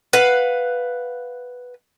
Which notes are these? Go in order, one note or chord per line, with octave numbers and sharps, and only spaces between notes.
B4 F5 F#5